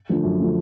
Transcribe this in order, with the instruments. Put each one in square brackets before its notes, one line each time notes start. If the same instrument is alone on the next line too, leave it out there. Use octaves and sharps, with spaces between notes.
[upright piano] D3 F3 A3
F#2
D3 F3 A3